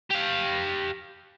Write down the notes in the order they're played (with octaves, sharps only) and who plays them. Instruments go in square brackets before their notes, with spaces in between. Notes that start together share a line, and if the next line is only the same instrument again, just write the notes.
[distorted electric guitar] G4 F5